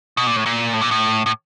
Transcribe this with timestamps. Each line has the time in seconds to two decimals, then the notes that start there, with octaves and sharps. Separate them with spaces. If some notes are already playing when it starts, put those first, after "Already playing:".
0.17 B2
0.27 A#2
0.36 A2
0.46 A#2
0.73 A2
0.81 A#2
0.91 A2
1.26 A2